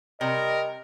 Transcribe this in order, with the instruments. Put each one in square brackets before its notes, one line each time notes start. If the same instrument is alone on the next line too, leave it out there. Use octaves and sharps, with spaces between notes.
[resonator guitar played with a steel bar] C3 [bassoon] G3 [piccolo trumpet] A#4 [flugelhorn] D#5